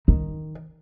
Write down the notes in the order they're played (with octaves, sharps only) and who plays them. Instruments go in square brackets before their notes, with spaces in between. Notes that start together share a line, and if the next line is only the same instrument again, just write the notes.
[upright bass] D#3